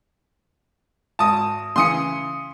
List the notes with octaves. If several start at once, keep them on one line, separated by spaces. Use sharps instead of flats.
G#1 A5 D#6
C#3 E3 C6 D#6 C#7